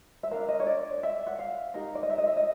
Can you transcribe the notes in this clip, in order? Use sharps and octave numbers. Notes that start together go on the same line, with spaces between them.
E5
D4 F#4 A#4 F5
D#5
C#5
D5
E5
F#5
F5
D#4 G4 A#4
D5
D#5
E5
D#5
E5
D#5